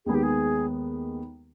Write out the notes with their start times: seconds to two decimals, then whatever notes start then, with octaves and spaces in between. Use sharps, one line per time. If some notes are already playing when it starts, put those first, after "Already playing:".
0.05 D#2 D#3 G#3 B3 G#4
0.14 G4
0.23 G#4